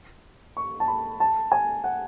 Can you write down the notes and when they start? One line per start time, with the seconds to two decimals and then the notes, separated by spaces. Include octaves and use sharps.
0.57 C#6
0.80 A5
0.88 B5
1.20 A5
1.52 G#5
1.84 F#5